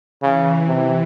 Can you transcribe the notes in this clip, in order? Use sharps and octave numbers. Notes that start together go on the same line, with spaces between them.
C#3 E3
C3 E3